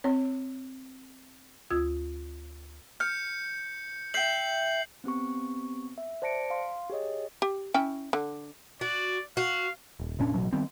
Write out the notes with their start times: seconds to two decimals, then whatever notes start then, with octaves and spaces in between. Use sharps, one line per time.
0.04 C4 C#5
1.70 D2 F4 D#6 E6 G#6
3.00 F6 G6 C#7
4.14 E5 G5 G6 C7 F#7
5.04 B3 C4 G4 C#6
5.98 E5
6.22 C5 D5 A5 A#6 C#7 D7
6.50 F5 C6
6.90 G4 G#4 C#5 D#5
7.42 G4
7.74 C#4 E4 G5
8.13 D3
8.81 F#4 D5
9.37 F#4 F5
10.00 D#1
10.19 F1 A#2 C#4 D4
10.34 A1 B2 F3 F#3
10.52 D#3 G3 B3 C4